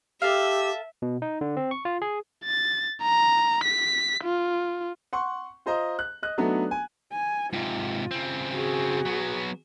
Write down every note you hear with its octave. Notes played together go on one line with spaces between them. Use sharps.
G4 A4 E5 F5
B2
D#4
D3
C4
C#6
F4
G#4
A6
A#5
B6
F4
F#5 C6 C#6
F4 C5 D#5 A#5
F#6
D#5 F#6
F#3 A3 B3 D4 D#4 F#4
G#5
G#5
G#2 C3 F4
C#3 C4
F#4 G#4
F#3 B3